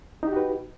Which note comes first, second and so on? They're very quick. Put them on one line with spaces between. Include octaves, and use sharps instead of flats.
D#4 G4 F#4 B4